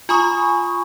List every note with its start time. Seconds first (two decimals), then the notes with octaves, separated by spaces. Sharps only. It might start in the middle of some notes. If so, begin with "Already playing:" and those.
0.09 F4 G#5 B5 C#6 D#6